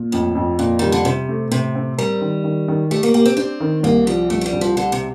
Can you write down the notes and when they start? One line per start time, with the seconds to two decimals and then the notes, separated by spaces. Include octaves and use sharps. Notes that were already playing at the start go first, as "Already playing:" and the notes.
Already playing: A#2
0.12 F2 A2
0.35 F2
0.58 F2 A#2
0.79 D#3 G3
0.92 D3
1.05 C3 C4
1.29 A3
1.51 A2 C3
1.75 C4
1.98 G3 A#4
2.21 D#3
2.44 D#3
2.68 D#3
2.91 A3 G4
3.03 A#3
3.14 A#3 G4
3.26 C4
3.37 C4 D4
3.60 D#3
3.83 C2 A#3
4.07 F3 G3
4.30 C2 A3
4.41 A3
4.46 G3
4.53 C2
4.61 F3
4.76 D3 G4
4.92 C3